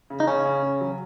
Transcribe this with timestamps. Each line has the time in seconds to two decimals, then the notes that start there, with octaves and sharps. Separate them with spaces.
0.10 C#3
0.20 D#4
0.27 C#3 C#4
0.45 C#3
0.63 C#3
0.81 F#3